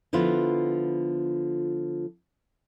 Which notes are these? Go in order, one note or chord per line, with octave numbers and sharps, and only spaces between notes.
D3 F3 B3 E4 F4